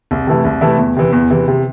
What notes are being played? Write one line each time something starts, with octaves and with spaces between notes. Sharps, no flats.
C2
C3 E3 A3 E4
C2
C3 E3 A3 E4
E2
C3 E3
E2
C3 E3
C3